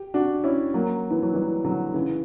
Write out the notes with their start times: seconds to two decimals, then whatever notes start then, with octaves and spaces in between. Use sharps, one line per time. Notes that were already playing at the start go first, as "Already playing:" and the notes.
Already playing: G4
0.14 D4 F#4
0.44 C#4 E4
0.74 F#3 A#3
1.10 E3
1.23 F#3
1.34 E3 G3
1.65 D3 F#3
1.94 C#3 E3